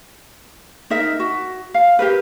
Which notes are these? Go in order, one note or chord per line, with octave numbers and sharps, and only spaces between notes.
D#4 A#4 E5
F#4
F5
G4 A#4 B4